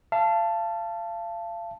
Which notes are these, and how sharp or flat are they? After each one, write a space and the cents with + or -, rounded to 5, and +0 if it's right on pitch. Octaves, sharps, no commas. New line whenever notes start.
F5 -35 A5 +0